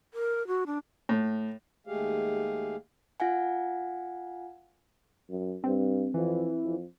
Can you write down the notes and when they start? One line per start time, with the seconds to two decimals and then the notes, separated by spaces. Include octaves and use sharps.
0.14 A#4
0.47 F#4
0.66 D4
1.09 A2
1.87 D#2 G#3 A3 G4 G#4 F5
3.20 F4 F5 F#5 G#5
5.30 F#2
5.64 G2 C4
6.14 F2 E3
6.65 F2